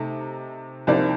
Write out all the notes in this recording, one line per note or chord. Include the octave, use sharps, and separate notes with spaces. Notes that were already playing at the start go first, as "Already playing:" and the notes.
Already playing: C3 A3 D#4
C2 C3 F3 A#3 D#4 D5